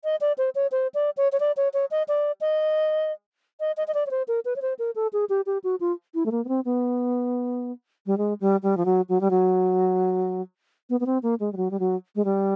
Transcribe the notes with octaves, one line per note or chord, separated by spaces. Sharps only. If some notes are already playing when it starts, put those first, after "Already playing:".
D#5
D5
C5
C#5
C5
D5
C#5
C#5
D5
C#5
C#5
D#5
D5
D#5
D#5
D#5
D#5
D5
C#5
C5
A#4
B4
C#5
C5
A#4
A4
G#4
G4
G4
F#4
F4
E4
A3
A#3
B3
C4
B3
G3
G#3
G3
G3
F3
F#3
F#3
G3
F#3
B3
B3
C4
A#3
G#3
G3
F#3
G3
F#3
G#3
G3